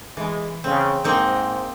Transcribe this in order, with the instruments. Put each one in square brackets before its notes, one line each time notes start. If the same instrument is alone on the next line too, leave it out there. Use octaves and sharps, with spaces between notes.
[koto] E3 [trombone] G#3
[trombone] C#3 [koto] C4
[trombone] G#2 [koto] A#3 C4 D#4